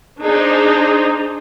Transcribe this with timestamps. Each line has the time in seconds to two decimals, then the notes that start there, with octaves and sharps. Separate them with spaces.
0.21 D4 D#4 G#4 C5